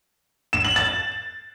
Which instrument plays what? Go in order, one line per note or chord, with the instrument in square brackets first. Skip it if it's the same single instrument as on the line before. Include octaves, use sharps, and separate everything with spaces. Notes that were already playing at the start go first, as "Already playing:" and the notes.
[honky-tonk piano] E7
F#7
A6